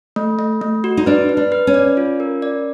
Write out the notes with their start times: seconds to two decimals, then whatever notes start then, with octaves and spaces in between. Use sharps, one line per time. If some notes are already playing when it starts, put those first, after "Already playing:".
0.16 A3
0.39 A3
0.61 A3
0.84 F#4
0.97 D#4
1.06 D4 B4
1.29 B4
1.37 D4
1.52 B4
1.67 C#4
1.74 D5
1.97 F4
2.20 A#4
2.42 D5